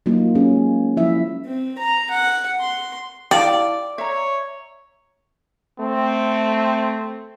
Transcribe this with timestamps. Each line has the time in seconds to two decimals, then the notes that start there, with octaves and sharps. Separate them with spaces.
0.06 F#3 A#3 D#4 F4
0.35 G#3 C#4 G#4
0.55 F#3
0.97 F3 E4 E5
1.46 C4
1.79 A#5
2.11 F#5
2.60 C6
3.31 E4 G4 D5 F5 A5
3.98 C#5 E5 A#5
5.80 A3 C4